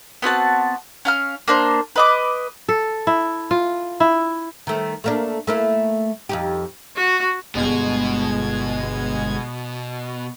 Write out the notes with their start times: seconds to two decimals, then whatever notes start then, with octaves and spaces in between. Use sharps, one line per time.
0.22 B3 C4 F#4 A5
1.05 C#4 F5 F6
1.48 A#3 D4 C5
1.96 B4 D#5 D6
2.69 A4
3.07 E4
3.51 F4
4.00 E4
4.67 D#3 A3
5.04 A3 A#3 D4
5.47 A3 A#3 E4
6.29 F2 D#4 G4
6.96 F#4
7.55 G1 B2 G#3 G#6